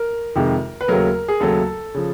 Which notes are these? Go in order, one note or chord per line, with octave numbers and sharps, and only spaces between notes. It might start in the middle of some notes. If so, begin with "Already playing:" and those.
Already playing: A#4
F2 C3 D#3 G#3
B4
D#2 C#3 F#3 A3 A#4
G#4
D#2 C#3 F#3 A3 A4
C#3 F3